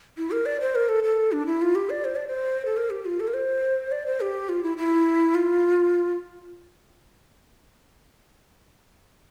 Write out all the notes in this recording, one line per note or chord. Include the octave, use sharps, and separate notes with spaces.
E4
A#4
D5
C5
A#4
A4
A4
D4
E4
F4
G4
D5
C5
D5
C5
A4
A#4
G4
F4
A4
A#4
C5
D5
C5
G4
F4
E4
E4
F4